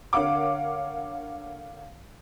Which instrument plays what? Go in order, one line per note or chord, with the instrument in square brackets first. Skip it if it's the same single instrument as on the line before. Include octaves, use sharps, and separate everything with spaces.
[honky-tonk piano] D3 A#4 C#5 F5 F#5 D6